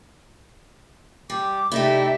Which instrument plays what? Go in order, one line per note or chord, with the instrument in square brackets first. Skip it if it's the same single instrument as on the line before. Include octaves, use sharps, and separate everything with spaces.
[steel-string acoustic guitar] G3 [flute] D6
[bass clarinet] C3 [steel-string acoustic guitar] A3 D#4 E4 [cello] G4 E5 [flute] D5